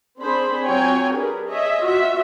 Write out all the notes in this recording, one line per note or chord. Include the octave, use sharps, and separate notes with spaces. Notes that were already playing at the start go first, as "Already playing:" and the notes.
C4 D4 G#4 C5 B5
F#3 C4 F4 C#5 G5 G#5
D4 G4 G#4 A#4 B4
G#4 C#5 D#5 E5
F4 F#4 E5